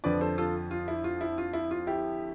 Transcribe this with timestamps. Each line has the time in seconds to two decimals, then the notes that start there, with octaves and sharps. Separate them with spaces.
0.04 F2 D3 F3 B4 D5
0.21 A4 C5
0.38 F4 A4
0.71 F4
0.88 E4
1.04 F4
1.21 E4
1.38 F4
1.53 E4
1.71 F4
1.87 E4 G4